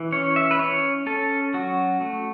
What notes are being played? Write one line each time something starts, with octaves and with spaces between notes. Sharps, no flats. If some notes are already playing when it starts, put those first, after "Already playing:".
Already playing: E3
C#4 C#5
E5
B4
C#4 C#5
C#4 A4
F#3 F#4
A3